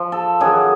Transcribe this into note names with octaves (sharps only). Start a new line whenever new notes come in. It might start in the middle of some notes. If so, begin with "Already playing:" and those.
Already playing: F3
A4
F#2 D#3 F#3 G#4